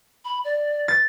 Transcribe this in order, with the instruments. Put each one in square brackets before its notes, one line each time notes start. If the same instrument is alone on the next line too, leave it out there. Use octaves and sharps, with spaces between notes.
[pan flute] B5
D5
[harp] A6